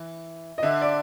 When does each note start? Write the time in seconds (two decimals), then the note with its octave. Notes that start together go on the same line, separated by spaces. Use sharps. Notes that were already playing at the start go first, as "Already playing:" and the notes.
Already playing: E3
0.58 D#5
0.63 D3 E5
0.82 D5